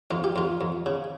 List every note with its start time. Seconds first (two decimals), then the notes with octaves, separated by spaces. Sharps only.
0.11 F2 F4
0.24 G4
0.36 F2 F4
0.61 F2
0.86 C#3